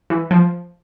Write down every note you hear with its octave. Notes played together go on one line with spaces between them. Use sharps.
E3
F3